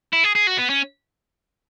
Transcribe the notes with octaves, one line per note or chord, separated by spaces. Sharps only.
E4
G#4
G#4
F#4
B3
C#4